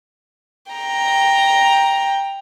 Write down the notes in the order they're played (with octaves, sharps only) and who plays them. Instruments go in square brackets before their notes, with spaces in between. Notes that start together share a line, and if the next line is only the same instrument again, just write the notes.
[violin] G5 A#5